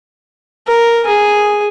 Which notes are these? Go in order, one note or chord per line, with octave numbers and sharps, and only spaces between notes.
A#4
G#4 G#5